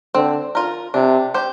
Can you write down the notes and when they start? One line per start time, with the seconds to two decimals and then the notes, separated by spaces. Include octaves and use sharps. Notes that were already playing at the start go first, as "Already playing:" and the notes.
0.15 D3 C4
0.55 F4 A#4
0.94 C3 D4
1.34 G4 C5